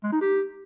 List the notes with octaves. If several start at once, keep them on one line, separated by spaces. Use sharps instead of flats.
G#3
D#4
G4